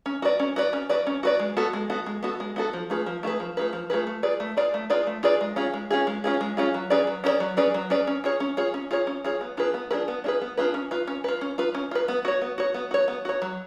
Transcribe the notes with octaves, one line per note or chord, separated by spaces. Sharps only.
C#4
F#4 B4 D5
C#4
F#4 B4 D5
C#4
F#4 B4 D5
C#4
F#4 B4 D5
G#3
B3 F#4 A4
G#3
B3 F#4 A4
G#3
B3 F#4 A4
G#3
B3 F#4 A4
F3
A3 F4 G#4 B4
F3
A3 F4 G#4 B4
F3
A3 F4 G#4 B4
F3
A3 F4 G#4 B4
A3
F4 G#4 B4 D5
A3
F4 G#4 B4 D5
A3
F4 G#4 B4 D5
A3
F4 G#4 B4 D5
G#3
C#4 F4 G#4
G#3
C#4 F4 G#4
G#3
C#4 F4 G#4
G#3
C#4 F4 G#4
F#3
C#4 G#4 B4 D5
F#3
C#4 G#4 B4 D5
F#3
C#4 G#4 B4 D5
F#3
C#4 G#4 B4 D5
C#4
F4 G#4 C#5
C#4
F4 G#4 C#5
C#4
F4 G#4 C#5
C#4
F4 G#4 C#5
B3
D4 F4 G#4 B4
B3
D4 F4 G#4 B4
B3
D4 F4 G#4 B4
B3
D4 F4 G#4 B4
C#4
F4 B4
C#4
F4 B4
C#4
F4 B4
C#4
F4 B4
B3
F#4 C#5
B3
F#4 C#5
B3
F#4 C#5
B3
F#4 C#5
F#3